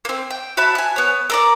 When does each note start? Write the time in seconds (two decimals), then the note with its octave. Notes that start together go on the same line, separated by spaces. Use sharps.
0.05 A#3 C4
0.31 G5
0.57 F#4 E5 A5 B5
0.75 G#5 F#6
0.96 B3 C#5
1.30 A4 A#4 D5